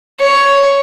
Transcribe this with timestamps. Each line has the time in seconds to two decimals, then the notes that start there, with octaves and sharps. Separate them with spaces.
0.20 C#5